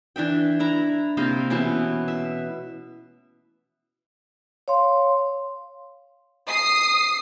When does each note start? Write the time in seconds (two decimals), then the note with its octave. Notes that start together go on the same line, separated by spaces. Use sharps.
0.16 E3 D4 E5 G5
0.59 D4 E4 A#5
1.17 C3 A#3 D#5 F5
1.50 B2 E3 A3 C#4
2.08 E5
4.68 C#5 F5 C6
6.48 D#6 C7